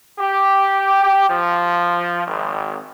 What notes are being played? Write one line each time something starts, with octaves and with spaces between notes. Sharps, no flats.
G4
F3
G#1